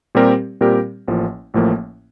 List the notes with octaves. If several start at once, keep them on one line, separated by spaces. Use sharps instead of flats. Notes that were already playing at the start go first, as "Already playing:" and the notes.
A#2 G3 C4 G4 A#4
A#2 G3 C4 G4 A#4
A1 A2 F3 A#3
A1 A2 F3 A#3